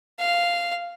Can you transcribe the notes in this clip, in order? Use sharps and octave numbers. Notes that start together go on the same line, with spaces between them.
F5